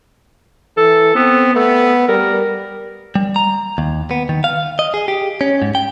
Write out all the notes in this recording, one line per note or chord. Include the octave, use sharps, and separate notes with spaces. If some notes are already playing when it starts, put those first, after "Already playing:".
E3 A4
B3 C4
A3 B3
G3 A#4
G3
A#5
D#2
B3
D#3
F5
D#5
G#4
G4
C#4
G#2
G5